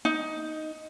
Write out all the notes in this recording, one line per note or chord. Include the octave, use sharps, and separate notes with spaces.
D#4